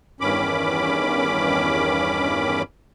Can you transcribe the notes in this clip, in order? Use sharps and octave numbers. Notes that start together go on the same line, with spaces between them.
E2 G2 D#3 C#4 B5 D6